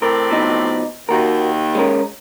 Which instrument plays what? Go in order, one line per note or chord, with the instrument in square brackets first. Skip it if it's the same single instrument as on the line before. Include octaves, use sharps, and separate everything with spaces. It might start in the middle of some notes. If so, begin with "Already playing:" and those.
[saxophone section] A2 C4 D5 [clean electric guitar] A#4
[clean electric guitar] B2 F3 D#4
[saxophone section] D#2 [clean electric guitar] F#4 A#4
[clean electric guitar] G#3 C#4 A#4